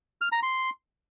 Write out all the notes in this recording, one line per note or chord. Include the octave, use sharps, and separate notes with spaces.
F6
A#5
C6